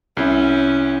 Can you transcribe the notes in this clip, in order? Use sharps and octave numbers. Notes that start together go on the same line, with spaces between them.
C2 C#4 E4